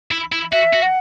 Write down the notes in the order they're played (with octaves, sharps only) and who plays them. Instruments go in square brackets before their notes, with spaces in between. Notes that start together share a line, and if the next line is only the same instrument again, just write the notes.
[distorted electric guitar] E4
E4
[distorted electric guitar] F#4 [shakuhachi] E5
[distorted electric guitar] F#4
[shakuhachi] F#5